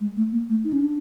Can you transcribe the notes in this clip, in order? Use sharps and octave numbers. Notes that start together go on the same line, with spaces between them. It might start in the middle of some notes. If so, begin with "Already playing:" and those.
G#3
A3
A#3
A3
D#4
C#4
D4